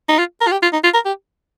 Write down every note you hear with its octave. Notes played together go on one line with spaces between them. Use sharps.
D#4
F4
A#4
F4
G4
F4
D#4
F4
A#4
G4